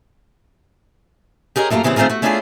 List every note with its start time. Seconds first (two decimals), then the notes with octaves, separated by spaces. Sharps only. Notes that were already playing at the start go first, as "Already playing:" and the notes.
1.56 G4 G#4 A#4 C#5 D#5
1.70 F#2 A3 A#3 F4 A#5
1.83 A#2 C#3 E3 B3 C4
1.96 D#3 A3 C4 F4 G#4 A#4
2.10 A3 F#4
2.22 A3 C#4 D4 E4 F4 G#4